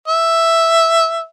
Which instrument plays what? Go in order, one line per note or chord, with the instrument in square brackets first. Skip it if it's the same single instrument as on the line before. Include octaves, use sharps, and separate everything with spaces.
[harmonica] E5